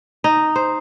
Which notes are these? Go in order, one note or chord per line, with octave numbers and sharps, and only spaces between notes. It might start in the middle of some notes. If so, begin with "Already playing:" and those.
D#4
C5